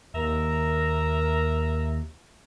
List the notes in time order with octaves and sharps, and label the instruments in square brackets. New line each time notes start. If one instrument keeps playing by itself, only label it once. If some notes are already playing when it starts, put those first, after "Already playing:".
[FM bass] D#2 [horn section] A#4 E5 A#5